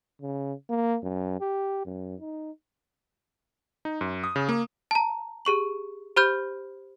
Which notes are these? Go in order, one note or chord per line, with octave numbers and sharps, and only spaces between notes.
C#3
A#3
F#2
G4
F#2
D#4
D#4
F#2
D#6
C#3
A#3
A5 A#5
G4 G#4 C#6 F#7
G4 C5 B5 F6 G6